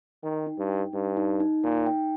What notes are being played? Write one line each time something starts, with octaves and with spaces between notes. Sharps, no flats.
D#3 G5
D#4
G2
G5
G2 D#4
D#4
D#4
A#2 D#4
G5